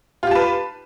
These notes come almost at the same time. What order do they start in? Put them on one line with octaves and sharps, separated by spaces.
F4 G4 A5 B4